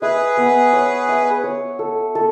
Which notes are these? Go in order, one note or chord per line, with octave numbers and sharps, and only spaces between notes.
G#4 B4 E5
B3
C#5
E5
C#5
A4
A4